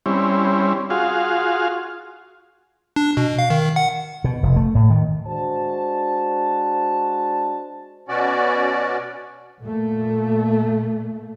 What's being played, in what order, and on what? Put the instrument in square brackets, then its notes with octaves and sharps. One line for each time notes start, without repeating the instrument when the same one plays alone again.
[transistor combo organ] G3 C4 C#4 E4
F4 F#4 G#4 F5
[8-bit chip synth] D4
B2
F5
D#3
F#5
[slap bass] B2
F1
A3
A2
D#3
[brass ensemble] G#3 D4 F#4 C5 A5
[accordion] B2 C#4 F#4 D5
[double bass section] A#2 A3